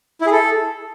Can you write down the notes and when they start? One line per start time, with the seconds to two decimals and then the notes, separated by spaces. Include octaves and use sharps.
0.21 E4
0.26 G#4
0.32 A4